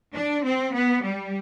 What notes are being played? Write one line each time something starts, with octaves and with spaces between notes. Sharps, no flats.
D4
C4
B3
G3